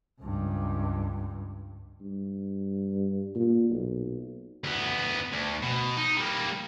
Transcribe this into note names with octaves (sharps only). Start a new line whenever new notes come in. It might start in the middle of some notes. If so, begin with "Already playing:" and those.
C#2 G2
G2
A#2
B1
D2 B3
D2
B2
D#4
G3 A#3